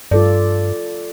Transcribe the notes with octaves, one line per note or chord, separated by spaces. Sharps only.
G2 F4 A4 D5